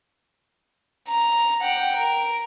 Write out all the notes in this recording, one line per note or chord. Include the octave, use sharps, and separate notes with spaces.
A#5
F#5 G5
A#4